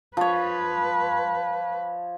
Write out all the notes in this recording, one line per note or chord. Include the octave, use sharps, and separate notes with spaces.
F3 B4 C#5